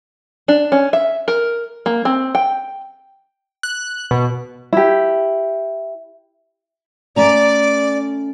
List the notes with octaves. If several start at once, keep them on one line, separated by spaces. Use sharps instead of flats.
D4
C#4
E5
A#4
A#3
C4
G5
F#6
B2
E4 G4
A3 C#4 D5 A#5